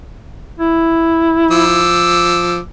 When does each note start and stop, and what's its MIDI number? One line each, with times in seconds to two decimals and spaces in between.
0.59 1.91 64
1.51 2.59 53
1.51 2.59 86
1.51 2.59 88